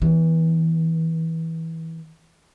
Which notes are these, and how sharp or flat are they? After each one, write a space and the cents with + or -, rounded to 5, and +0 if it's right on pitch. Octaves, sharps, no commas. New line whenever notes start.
E3 -20 B3 +0